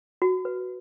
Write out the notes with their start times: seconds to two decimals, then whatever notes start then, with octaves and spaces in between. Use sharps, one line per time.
0.22 F#4
0.45 B4